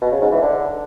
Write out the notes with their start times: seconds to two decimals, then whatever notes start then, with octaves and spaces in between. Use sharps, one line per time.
0.02 B2
0.12 C#3
0.22 G#2
0.32 E3
0.42 D3